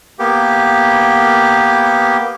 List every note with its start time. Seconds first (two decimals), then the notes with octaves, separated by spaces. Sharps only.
0.19 A#3 B3 G4